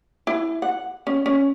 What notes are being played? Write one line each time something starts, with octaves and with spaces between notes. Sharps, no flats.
E4
F#5
C#4
C#4